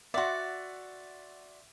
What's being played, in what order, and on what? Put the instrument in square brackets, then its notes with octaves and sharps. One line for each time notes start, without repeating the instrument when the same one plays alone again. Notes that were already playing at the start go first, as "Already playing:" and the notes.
[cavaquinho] F#4 D5 [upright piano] E5 F#5 C6